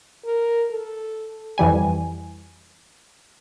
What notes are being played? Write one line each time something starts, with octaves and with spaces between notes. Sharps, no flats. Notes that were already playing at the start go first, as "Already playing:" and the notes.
A#4
A4
F2 E3 G3 G#5